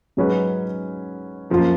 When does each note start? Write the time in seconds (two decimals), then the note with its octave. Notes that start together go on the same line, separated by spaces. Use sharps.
0.17 G#2 F#3 C#4 G#4 B4
1.50 F#2 F3 A#3 F4